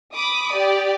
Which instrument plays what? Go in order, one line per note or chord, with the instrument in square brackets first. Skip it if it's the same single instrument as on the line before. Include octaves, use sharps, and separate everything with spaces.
[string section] B5 D6 D#6
G4 D5